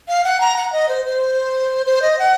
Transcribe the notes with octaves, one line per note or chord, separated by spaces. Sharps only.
F5
F#5
A#5
F#5
D#5
C5
C5
C5
D#5
F#5